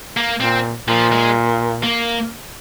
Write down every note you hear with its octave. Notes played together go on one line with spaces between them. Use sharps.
A#3
A#2 C4
A#2 F3
G#3
A#3